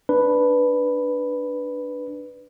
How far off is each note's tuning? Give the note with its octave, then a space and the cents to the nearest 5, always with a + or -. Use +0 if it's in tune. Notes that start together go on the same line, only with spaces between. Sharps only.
D4 +0 B4 +0